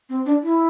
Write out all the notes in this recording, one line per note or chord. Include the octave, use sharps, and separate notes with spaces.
C4
D4
E4